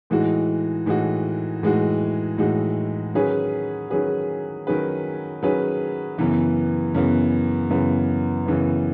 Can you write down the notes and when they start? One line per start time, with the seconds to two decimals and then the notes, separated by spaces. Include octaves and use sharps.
0.10 A2 E3 G#3 D#4 F#4
0.86 A2 E3 G#3 D#4 F#4
1.63 A2 E3 G#3 D#4 F#4
2.38 A2 E3 G#3 D#4 F#4
3.14 D#3 F#3 C#4 G#4 B4
3.90 D#3 F#3 C#4 G#4 B4
4.67 D#3 F#3 C#4 G#4 B4
5.43 D#3 F#3 C#4 G#4 B4
6.18 F#2 C#3 E3 B3
6.95 F#2 C#3 E3 B3
7.70 F#2 C#3 E3 B3
8.46 F#2 C#3 E3 B3